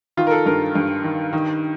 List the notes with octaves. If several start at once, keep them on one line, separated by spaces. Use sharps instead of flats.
D#3 F4
A#4
A4
G2 A#4
G2
D#3
D#3